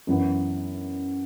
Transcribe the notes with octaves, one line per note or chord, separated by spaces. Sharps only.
F#2 E3 B3